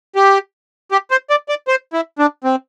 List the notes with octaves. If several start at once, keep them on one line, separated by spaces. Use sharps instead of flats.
G4
G4
C5
D5
D5
C5
E4
D4
C4